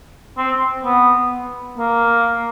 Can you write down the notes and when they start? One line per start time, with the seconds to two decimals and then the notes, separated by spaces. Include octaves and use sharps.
0.38 C4
0.84 B3
1.78 A#3